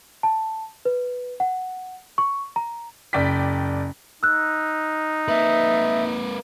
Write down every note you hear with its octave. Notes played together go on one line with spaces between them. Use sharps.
A5
B4
F#5
C#6
A#5
F#1 D5 G5 B6
D#4 E6 F#6
A#3 B4 E5